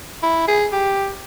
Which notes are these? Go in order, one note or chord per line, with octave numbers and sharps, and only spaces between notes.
E4
G#4
G4